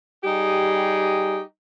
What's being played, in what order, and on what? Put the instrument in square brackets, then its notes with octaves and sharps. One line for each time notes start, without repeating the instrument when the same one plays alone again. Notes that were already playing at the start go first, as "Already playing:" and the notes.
[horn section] G3 D#4 G4 G#4